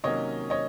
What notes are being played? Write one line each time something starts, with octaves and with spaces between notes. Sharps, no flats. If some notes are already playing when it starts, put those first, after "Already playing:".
C3 D#3 F#3 A#3 C#4 C#5 D#5
C#5 D#5